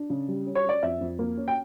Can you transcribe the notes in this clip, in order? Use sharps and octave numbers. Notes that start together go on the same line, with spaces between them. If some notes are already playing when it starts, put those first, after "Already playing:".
Already playing: D4
C#3
G3
C#4
C#5
C#4 D5
F2 E5
F2
A#3
C#4
G5